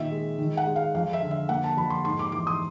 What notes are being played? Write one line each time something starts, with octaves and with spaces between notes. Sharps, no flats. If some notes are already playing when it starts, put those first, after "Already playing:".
Already playing: A#2 D#3 E5
G#3
D#3
F#5
G#3
F5
F2 F5
E5
D3
E5
A#3 F#5
A5
F2 B5
C6
G#2 C6
D6
E3 D6
D#6